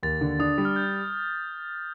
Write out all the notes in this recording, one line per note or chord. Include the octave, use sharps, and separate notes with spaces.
D#2 A6
D3
D4 D#6
G3
F6
G6